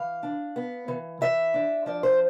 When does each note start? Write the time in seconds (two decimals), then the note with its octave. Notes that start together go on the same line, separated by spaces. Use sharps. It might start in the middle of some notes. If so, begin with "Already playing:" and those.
Already playing: E3 F5
0.23 D4
0.56 B3
0.88 E3
1.21 E3 E5
1.54 D4
1.86 F3 D5
2.03 C5